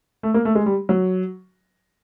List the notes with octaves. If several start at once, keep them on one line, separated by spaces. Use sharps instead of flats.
A3
A#3
A3
G#3
G3
F#3